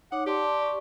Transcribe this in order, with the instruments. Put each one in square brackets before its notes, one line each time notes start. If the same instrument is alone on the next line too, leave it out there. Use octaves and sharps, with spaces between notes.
[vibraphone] D#4 C#5 D6 [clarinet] F#5
[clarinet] G4 [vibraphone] D5 A5 C6
[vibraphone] D5 C#6